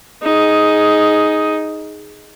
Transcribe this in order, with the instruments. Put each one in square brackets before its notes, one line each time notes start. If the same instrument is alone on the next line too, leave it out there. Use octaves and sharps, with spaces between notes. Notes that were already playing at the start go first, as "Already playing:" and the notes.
[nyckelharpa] D#4 G#4